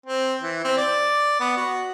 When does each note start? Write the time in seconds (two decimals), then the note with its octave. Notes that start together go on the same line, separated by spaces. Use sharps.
0.06 C4
0.40 E3
0.64 C4
0.77 D5
1.40 B3
1.57 F#4